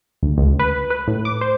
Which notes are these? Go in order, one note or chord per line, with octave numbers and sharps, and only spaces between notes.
D2
C#2
B4
B4
A2
D6
C5